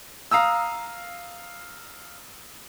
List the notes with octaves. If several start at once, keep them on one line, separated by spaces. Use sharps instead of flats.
F5 A#5 D#6 E6